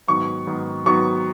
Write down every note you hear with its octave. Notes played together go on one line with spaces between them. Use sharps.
G#2 D#3 F#3 B3 C#6
G#2 D#3 F#3 B3
G#2 D#3 F#3 B3 C#6